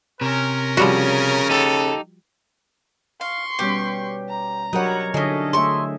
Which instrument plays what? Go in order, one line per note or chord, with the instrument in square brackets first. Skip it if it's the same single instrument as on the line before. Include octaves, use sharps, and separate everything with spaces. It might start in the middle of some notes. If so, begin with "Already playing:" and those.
[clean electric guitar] C3 [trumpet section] C#4 A#4
[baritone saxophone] C#3 [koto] F3 G3 F#4
[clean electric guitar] D#4 G4 [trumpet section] A4
[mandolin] F5 [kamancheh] C6 C#6
[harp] B2 G3 C#4 [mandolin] G4
[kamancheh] A#5
[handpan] F#3 A#4 C#5 [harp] D4 G4 D#5 [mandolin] B4 F#5
[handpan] D3 D#5 [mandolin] C#4 G#4 [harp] D#4 E4 [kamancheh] A4
[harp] A3 E4 [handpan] G#4 E5 [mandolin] C6 C#6